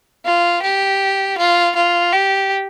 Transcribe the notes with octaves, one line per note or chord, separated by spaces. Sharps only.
F4
G4
F4
F4
G4